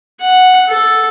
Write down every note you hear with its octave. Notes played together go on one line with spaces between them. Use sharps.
F#5
A4